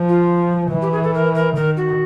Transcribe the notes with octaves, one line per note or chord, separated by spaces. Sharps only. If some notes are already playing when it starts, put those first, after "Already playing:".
Already playing: F3
F4
E3
G4
G#4
A4
A#4
A#4
D#3 A#4
F#4